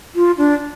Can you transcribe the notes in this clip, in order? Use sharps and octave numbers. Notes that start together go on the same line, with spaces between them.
F4
D4